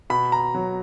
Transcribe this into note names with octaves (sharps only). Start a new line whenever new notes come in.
B2 B5
A#5
F#3